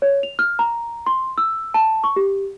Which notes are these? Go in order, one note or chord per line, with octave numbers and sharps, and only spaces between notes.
C#5
F7
F6
A#5
C6
E6
A5
C#6
G4